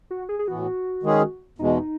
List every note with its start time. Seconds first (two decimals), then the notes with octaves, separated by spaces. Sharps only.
0.11 F#4
0.29 G#4
0.39 G#4
0.48 A2 E3 B3 F#4
1.03 D#3 G#3 C#4 G#4
1.58 E2 B2 G#3 D#4